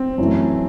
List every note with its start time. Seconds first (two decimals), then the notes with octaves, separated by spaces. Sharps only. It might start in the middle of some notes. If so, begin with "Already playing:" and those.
Already playing: C4
0.18 F#2 E3 A3